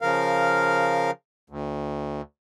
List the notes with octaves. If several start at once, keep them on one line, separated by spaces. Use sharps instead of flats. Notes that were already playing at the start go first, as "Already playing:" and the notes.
C#3 F3 A#4 F5
D2